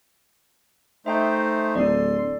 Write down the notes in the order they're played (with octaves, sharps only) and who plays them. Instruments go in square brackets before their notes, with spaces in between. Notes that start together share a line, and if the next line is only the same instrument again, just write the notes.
[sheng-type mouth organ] A3 D#4 C5 [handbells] E5 G5 G6
[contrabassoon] D1 [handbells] A4 D5 [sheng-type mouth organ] C6